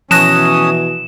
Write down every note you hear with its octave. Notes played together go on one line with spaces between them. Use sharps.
B2 E3 F3 C#4 D#6 F#6 A#6 E7